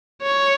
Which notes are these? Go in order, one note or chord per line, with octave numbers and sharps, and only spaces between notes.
C#5